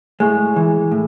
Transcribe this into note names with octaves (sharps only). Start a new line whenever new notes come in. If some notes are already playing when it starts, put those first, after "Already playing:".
A2 G#3
E3
A2